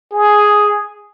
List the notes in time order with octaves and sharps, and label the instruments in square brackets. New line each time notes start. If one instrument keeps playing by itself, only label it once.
[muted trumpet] G#4